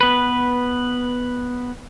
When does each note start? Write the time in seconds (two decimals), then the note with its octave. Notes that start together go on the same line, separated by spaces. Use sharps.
0.01 B3 B4